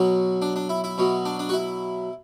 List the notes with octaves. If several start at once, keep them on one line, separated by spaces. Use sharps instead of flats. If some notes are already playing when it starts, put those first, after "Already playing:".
Already playing: B2 F#3
D4
D4
E4
E4
B2 F#3
D4
D4
F#4
E4